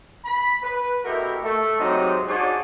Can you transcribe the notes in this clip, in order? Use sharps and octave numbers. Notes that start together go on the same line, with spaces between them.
B5
B4
B2 A3 E4 F#4 G4 A#4
A3
G#2 C3 F#3 C4 D#4
D4 D#4 F#4 G#4 C#5 D5